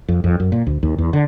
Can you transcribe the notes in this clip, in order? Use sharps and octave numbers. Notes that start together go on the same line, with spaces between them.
F2
F2
F#2
A#2
D2
D#2
E2
D3